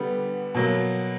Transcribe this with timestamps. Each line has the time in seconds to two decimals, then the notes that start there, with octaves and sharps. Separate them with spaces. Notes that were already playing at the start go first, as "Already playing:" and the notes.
Already playing: D3 G3 B3
0.55 B2 F#3 A#3